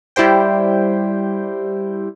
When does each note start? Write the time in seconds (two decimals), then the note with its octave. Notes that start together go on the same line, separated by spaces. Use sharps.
0.16 G3 E4 G4 C5 G5